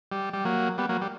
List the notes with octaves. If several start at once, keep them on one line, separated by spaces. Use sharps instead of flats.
G3
G3
F#3 A#3
G3 B3
F#3 A#3
G3